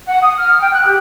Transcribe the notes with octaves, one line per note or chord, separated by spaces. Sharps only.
F#5
D#6
F6
G5
F#6
G4